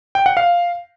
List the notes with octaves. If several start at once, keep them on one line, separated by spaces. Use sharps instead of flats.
G5
F#5
F5